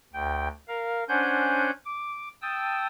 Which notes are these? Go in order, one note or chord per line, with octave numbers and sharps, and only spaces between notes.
D2 G5
A#4 F5
C#4 D4 C5 F#5 G#5 G6
D6
G5 A5 D#6 E6